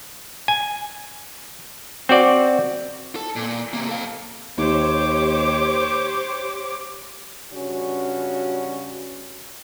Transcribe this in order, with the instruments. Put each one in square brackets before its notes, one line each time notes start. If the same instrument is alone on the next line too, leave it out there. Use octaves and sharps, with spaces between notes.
[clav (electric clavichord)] G#5
C4 F#4 D5
[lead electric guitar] A4
A#2
C3 A#3
A4 F5
[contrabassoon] D#2 [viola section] G4 C5 C#5 [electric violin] D6
[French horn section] G2 C#3 C#4 F#4